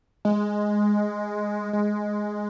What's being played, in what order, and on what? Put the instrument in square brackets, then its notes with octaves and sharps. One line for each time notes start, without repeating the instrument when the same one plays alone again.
[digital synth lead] G#3
G#3